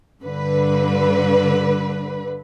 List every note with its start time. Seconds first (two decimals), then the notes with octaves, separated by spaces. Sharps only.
0.22 G2 D3 B4